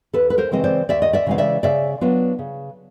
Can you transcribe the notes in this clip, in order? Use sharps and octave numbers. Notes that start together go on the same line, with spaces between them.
D#2 A4 B4
B4
A#4 C5
C#3 E3 G#3 C4 D#5
C5 D5
D#2 D5 E5
D#5
D5 E5
C#3 E3 G#3 C4 F5
D5 E5
C#3 D5 E5
F#3 B3 D4 F4
C#3